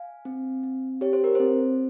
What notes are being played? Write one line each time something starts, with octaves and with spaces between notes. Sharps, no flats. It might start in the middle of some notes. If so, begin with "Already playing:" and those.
Already playing: F5 G#5
C4
C4
G4 C#5
C5
A#4
C4 C5